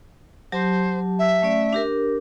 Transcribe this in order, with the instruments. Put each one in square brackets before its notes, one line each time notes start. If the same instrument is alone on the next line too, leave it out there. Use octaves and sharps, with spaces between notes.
[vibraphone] F#3 G4 A5 [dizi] C5
[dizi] E5
[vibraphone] A3 C#4 D5
D4 G4 A#4